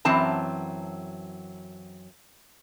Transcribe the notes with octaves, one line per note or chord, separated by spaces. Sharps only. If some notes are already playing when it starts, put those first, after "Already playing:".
F#2 E3 F#3 C4 A5 A#5